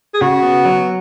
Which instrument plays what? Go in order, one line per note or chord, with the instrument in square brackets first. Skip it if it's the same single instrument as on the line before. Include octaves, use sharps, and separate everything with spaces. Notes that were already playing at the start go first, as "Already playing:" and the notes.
[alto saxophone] G#4
[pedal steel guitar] C#3 [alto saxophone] F#4
[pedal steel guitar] B3
F#3